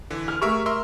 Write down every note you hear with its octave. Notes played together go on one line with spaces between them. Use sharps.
D3 E3
F6
A3 G4 G#4 A#4 E5 C#6
A#4 E5 C6 E6